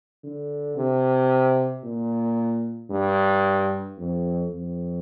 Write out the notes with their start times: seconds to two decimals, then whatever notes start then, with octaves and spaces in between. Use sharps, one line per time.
0.24 D3
0.77 C3
1.84 A#2
2.91 G2
3.98 F2
4.52 F2